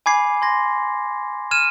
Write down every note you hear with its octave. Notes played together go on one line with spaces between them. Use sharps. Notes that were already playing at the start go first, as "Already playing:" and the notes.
G#5 B5 D6 G#6 C7
C6 G#6 A#6
F6 G#6 D#7 E7